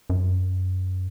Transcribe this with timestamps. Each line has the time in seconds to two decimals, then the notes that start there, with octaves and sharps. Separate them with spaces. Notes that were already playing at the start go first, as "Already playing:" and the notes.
0.10 F#2